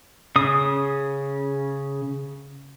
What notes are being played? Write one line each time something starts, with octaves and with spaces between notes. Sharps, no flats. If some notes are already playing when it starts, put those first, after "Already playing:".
C#3 D#6